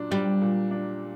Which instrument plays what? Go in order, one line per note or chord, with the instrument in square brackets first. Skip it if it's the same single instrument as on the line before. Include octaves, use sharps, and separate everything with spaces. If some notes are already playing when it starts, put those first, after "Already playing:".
Already playing: [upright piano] A#2 F#3 D4
[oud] G3 [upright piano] D4
[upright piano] A#2
D4